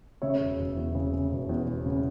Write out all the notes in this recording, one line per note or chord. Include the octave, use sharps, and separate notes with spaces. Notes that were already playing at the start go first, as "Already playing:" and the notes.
C#3 C#5 E5
E1
E1
E2
C#3
C#3
E1
E2
E1
C#3